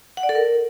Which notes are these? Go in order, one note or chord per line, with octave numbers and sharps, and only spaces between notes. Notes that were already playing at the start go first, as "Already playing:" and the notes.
F#5
D5
A4
A#4